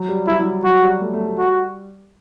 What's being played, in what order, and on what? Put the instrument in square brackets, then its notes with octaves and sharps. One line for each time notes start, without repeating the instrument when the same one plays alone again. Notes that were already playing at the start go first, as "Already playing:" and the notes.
Already playing: [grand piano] F#3
G3
[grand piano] G3 [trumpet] E4
[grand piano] F#3
[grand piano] F#3 [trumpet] F#4
[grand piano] G3
A3
A3
G3
[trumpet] F#4